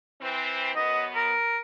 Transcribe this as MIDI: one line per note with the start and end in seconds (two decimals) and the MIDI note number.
0.22 0.71 52
0.22 0.71 60
0.76 1.34 42
0.76 1.34 59
0.76 1.04 75
1.15 1.58 70